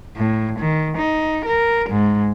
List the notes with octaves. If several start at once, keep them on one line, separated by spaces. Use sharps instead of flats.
A2
D#3
D#4
A#4
G#2